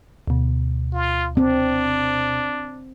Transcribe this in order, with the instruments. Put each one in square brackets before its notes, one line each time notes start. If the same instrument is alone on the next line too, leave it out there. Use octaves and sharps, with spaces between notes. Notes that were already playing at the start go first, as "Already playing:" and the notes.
[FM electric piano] D2 B2
[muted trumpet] F4
[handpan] C4 [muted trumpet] D4